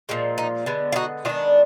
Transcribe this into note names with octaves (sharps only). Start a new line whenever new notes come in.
A#2 F3 G#3
D#4
D3 G#3 B3
F4
D#4 F#4
D#3 G#3 B3 D4 F4